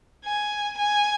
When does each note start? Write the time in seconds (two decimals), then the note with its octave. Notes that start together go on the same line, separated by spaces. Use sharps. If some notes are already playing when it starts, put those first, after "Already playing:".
0.25 G#5
0.77 G#5